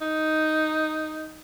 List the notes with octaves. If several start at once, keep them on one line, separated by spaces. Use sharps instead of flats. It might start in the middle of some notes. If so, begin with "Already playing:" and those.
D#4